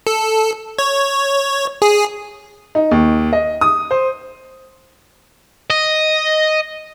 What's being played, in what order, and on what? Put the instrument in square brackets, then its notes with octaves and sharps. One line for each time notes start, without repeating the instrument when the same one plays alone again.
[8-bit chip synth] A4
C#5
G#4
[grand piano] D#4
D#2
D#5
D#6
C5
[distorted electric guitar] D#5